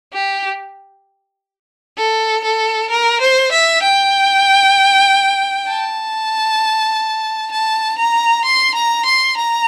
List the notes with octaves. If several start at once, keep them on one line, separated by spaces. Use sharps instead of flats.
G4
A4
A4
A#4
C5
E5
G5
A5
A5
A#5
C6
A#5
C6
A#5